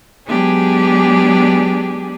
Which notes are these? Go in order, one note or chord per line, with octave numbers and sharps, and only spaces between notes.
F#3 G#3 B3 D4 G4 G#4